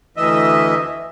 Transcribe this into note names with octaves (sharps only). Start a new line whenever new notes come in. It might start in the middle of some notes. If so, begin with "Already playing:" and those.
D2 E3 D#5 E5